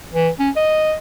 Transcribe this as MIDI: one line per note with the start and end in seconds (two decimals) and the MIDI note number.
0.14 0.30 52
0.39 0.50 61
0.56 0.94 75